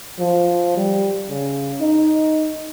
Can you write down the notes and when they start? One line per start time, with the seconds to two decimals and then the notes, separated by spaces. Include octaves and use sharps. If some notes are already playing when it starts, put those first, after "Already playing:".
0.19 F3
0.77 G3
1.29 C#3
1.81 D#4